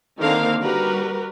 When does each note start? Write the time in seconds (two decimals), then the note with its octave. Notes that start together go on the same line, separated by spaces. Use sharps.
0.19 D3 D#3 A#3 C4 A#4 F5
0.61 G3 F#4 A#4 B4